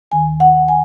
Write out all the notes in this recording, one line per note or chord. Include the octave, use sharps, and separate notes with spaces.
D#2 D#3 G#5
F#5
G#5